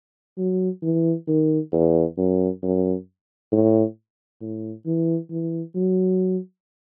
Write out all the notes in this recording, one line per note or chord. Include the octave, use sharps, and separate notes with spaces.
F#3
E3
D#3
E2
F#2
F#2
A2
A2
E3
E3
F#3